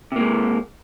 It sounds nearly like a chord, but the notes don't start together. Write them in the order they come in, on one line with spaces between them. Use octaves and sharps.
C3 A#3 G#3